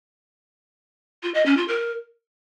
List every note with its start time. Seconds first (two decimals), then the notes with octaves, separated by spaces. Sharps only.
1.23 F4
1.34 D#5
1.46 C#4
1.57 F4
1.68 A#4